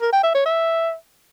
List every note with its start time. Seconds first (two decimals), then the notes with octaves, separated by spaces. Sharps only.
0.01 A#4
0.12 G5
0.23 E5
0.35 C#5
0.46 E5